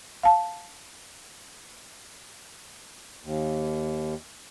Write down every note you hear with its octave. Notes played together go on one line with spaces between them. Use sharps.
F5 A5
D#2